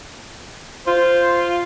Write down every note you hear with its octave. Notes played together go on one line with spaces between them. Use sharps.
F4 C5